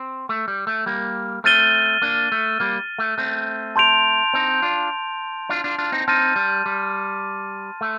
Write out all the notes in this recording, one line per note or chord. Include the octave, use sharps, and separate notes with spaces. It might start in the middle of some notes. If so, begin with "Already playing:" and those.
Already playing: C4
A3
G3
A3
G3 A#3
A3 C4 F6 A6 D#7 G7
A#3 D4
A3
G3 A#3
A3
A3 C4
A5 C6 G6 D7 F7
C4 D#4
D4 F4
D4 F4
D4 F4
D4 F4
C4 D#4
C4 D#4 A5 C6 F6 A6 D#7
G3
G3
A3